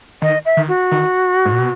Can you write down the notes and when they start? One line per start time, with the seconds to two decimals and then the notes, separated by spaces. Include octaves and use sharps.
0.22 D#3 D#5
0.45 E5
0.57 D#3
0.68 F#4
0.91 D#3
1.45 G#2
1.52 A#2
1.59 B2